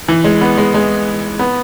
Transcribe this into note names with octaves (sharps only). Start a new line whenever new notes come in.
E3
G#3
B3
G#3
G#3
B3